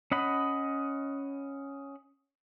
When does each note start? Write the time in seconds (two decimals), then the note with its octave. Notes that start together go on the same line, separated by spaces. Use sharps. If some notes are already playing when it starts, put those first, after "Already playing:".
0.12 C#4 D#5 F#5 B5